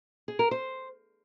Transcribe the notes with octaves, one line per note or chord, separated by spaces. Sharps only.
G#4
A#4
C5